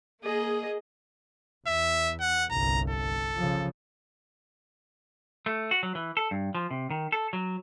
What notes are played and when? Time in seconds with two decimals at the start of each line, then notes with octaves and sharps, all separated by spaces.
0.24 A#3 G#4 D#5
1.67 E2 E5
2.20 F#5
2.51 G1 C2 A#5
2.90 A4
3.37 C#3 F3
5.46 A3
5.71 F#4
5.83 F#3
5.95 E3
6.17 A4
6.31 G2
6.55 F3
6.71 C3
6.91 D#3
7.12 A4
7.33 F#3